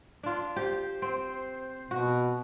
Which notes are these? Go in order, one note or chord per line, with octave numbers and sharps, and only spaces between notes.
D4 F4
G4 C5
C4
B2 F#4